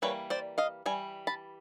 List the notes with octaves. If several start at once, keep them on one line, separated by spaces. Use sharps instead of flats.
E3 G3 A#3 B4 C#5
C5 D5
D#5 F5
E3 G3 G#5
A5 B5